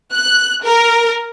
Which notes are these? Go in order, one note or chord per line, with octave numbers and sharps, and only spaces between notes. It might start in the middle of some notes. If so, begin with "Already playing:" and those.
F#6
A#4